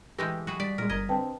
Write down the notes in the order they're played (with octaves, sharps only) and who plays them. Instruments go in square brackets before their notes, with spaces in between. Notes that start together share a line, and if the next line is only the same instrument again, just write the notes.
[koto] E3 G#3 A3 [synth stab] G4 [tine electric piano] B4 [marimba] G6 A#6
[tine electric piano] F#3 [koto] F#4 G#4 B4
[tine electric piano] G3 B6 [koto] D5
[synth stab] A#2 G#3 [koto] A#4
[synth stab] G1 A#4 [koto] D#5 [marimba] G#6
[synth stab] D3 C4 [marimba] B4 G5 A5